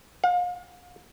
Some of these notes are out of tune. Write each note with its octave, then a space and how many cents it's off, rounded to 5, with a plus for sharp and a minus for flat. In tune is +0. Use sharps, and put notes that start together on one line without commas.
F5 +40